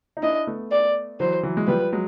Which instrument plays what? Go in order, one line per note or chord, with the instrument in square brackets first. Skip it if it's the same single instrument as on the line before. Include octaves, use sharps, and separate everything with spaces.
[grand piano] D#4
[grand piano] D4 E4 [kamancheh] D#5
[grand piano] A3 B3
[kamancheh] D5
[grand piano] E3 F#3 [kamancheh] C5
[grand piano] E3 F#3
G#3
[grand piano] F3 G3 [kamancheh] B4
[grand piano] F#3 G#3